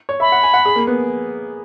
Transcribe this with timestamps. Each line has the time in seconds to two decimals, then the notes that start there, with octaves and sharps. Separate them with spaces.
0.09 C#5
0.20 E5 B5
0.32 F#5
0.43 G#5
0.54 F#5
0.65 G#4
0.76 A#3
0.87 B3